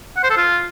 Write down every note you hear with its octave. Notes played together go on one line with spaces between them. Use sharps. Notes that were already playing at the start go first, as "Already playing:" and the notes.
F#5
C5
A4
F4